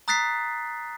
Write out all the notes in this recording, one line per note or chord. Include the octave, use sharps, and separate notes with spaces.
A#5 D#6 F#6 A6 B6 C7